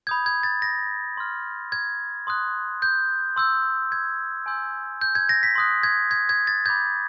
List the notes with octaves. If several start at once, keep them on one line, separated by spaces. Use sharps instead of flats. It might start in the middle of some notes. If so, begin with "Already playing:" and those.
B5 D#6 G6 G#6
G#6
A6
A#6
C6 F6
G#6
C6 D#6 F#6
G6
C6 E6 G6
G#6
G#5 C6 E6 G6
G6
G#6
A#6
B6
C6 D#6 F#6
G#6
G#6
G#6
A6
B5 D6 G6 G#6